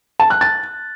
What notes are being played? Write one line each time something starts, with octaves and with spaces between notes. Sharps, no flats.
A5
F#6
A6